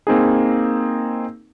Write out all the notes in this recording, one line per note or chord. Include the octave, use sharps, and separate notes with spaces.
A#3 C4 D#4 G#4